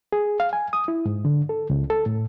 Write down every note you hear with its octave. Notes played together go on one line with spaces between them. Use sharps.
G#4
F5
G#5
D#6
E4
G#2
D3
A4
C#2
A4
A2